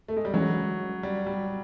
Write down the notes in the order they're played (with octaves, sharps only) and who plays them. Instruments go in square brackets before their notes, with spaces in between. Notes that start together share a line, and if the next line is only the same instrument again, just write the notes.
[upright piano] A3
G#3
G3
[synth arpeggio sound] E3 G#3 C#4 [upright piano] F#3
[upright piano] G3
G3